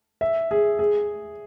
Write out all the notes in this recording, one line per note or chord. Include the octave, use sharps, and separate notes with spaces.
E5
G#4
G#4